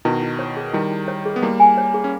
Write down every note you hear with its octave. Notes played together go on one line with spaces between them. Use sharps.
B2 D#3 E4
E4
C#5
G#4
D#3 G3 E4
E4
C#5
G#4
B3
G3 A#3 E4
G#5
C#5
G#4
C#4